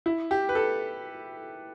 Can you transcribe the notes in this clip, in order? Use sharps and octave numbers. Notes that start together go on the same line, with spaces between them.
E4
G4
B4
A4